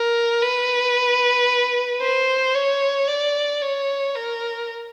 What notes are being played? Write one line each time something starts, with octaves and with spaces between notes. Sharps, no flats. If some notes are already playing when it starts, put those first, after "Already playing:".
Already playing: A#4
B4
C5
C#5
D5
C#5
A#4